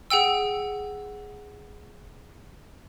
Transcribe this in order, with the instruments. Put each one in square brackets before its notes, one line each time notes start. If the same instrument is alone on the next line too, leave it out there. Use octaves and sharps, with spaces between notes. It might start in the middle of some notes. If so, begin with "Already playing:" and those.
[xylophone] G#4 F#5 G5 E6